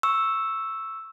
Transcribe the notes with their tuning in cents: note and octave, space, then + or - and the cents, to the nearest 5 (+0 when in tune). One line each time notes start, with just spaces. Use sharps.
C#6 -5 E6 +0